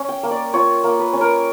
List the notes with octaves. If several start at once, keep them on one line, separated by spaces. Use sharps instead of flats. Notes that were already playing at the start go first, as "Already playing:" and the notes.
Already playing: C#4
G5
A#3
D5
F4 C#5
A#3
B4
C#4
A#4